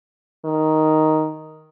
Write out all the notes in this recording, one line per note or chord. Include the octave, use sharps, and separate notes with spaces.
D#3